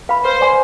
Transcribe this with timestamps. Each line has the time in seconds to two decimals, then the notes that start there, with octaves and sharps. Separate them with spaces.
0.09 B4 F5 B5
0.24 B4 C5
0.41 D5 G#5 C6